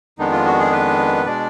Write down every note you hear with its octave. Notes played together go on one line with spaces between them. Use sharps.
F2 D#3 G#3 B3 D4 D#4
F4
F#4
G#4
B4
B2 G#3 D4 D5